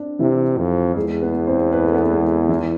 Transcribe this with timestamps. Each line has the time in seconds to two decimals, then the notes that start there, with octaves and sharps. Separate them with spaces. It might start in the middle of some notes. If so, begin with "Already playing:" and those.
Already playing: C4 D4
0.19 C3 E3 E4
0.58 F2
0.96 E2 G#3 G#4
1.22 B3 B4
1.47 C4 C5
1.72 B4
1.84 A4
1.94 B3 B4
2.11 G#3 G#4
2.49 E3 E4